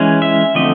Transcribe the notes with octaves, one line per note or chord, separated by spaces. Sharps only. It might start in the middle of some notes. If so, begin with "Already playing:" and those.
Already playing: E3 G#3 C#4
E5
D3 F3 A3 C4 D#5